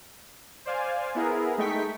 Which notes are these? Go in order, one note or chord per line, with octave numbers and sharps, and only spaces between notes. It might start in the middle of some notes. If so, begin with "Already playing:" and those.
C5 D5 F5 G#5
B3 E4 G#4 A#4
G#3 A3 D#4 G5 C#6 B6